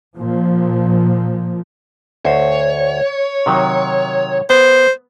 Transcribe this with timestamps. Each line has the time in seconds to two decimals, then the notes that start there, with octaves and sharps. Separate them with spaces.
0.17 A#2 F3
2.25 D2 C5 C#5
3.46 C3 D#3 F#3
4.50 B3 C5